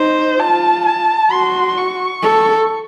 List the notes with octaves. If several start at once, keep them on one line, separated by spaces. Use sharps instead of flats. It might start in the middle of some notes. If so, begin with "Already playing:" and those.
Already playing: D#4 C5
F4 A5
A5
F#4 C6
C#6
A4